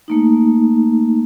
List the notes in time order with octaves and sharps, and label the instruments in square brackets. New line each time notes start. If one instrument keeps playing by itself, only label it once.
[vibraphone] A3 A#3 D#4